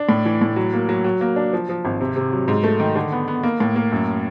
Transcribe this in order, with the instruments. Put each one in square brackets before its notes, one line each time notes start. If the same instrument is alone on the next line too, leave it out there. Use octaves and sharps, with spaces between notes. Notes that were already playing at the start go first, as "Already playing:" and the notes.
Already playing: [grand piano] D4
A2
E3
A2
F#3
A#3
F#3
F#3
A#3
D4
F3
F3
G#1
C3
C3
F#3
G#2
A3
D#3
D3
B3
B3
A#3
A2
A#3
F#2